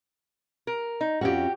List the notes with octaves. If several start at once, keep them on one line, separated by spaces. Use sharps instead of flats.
A#4
D#4
F2 C#4 F#4 G4 F#5